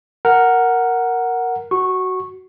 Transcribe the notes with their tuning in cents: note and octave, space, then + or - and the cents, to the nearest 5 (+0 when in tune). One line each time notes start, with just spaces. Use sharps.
A#4 +0 F#5 +0
F#4 +10 C#6 -15